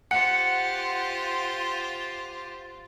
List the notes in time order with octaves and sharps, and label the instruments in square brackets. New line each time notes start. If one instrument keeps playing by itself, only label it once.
[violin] F4 [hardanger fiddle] G4 C5 [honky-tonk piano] F#5 [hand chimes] C#7